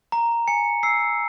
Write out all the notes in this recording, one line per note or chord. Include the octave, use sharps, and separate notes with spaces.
A#5
G#5 C#7
E6 C7